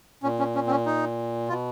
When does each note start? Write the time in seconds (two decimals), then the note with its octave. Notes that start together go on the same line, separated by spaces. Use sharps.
0.23 A#2 C#4
0.39 C#4
0.55 C#4
0.67 C4
0.71 C#4
0.86 D#4
1.48 B2 F4